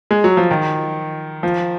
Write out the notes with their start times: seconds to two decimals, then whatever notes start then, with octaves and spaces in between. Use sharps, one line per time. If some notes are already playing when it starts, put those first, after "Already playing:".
0.11 G#3
0.24 F#3
0.37 F3
0.51 D#3
1.43 F3